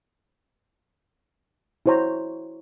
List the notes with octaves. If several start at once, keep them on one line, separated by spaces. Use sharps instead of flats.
E4 F#4 C5 C#5 A#5